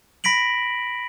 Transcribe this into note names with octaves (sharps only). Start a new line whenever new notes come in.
B5 A#6 B6 D7 F#7